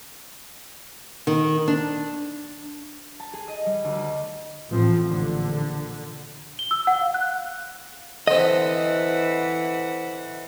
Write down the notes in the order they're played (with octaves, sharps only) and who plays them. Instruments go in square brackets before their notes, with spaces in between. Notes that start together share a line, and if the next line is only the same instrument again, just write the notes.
[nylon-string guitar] D#3
D4
[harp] A5
G#4
D#5
G3
D2
[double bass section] A1 A2 F3 C4
A#1 D3
[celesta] G7
E6
F#5
F5
F#6
[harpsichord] D3 C4 [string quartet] E3 F#5 [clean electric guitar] D#5